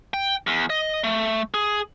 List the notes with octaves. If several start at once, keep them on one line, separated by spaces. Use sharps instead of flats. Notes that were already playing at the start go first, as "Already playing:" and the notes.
G5
E2
D#5
A3
G#4